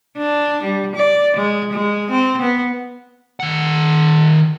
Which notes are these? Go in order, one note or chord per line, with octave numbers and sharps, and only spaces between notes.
D4
G3
D5
G#3
G#3
C4
B3
D#3 F#5